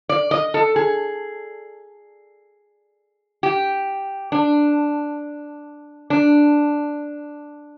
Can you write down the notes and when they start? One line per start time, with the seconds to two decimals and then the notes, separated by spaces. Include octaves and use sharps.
0.09 D5
0.31 D#5
0.54 A4
0.76 G#4
3.43 G4
4.32 D4
6.10 D4